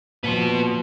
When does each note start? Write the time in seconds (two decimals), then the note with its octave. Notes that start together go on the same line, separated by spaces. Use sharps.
0.24 A#2 F3 F#4 B4